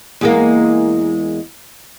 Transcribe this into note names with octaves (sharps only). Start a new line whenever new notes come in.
E2 G#3 A#3